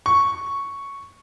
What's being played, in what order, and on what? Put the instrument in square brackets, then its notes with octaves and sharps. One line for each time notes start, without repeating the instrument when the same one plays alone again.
[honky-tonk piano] C#6